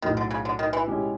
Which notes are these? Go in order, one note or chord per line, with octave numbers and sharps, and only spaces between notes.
B1 A2 D#3 F#3
D3
C#3
D3
D#3
E3
B2 G#3 C#4 E4 G4